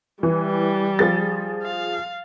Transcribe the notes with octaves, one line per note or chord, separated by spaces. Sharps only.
E3 G3
F3 G#4 A6
F5